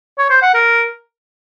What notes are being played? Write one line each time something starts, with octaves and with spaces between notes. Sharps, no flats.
C#5
C5
F#5
A#4